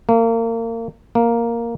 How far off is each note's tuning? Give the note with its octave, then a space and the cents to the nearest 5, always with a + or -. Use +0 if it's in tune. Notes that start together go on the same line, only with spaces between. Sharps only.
A#3 -30
A#3 +0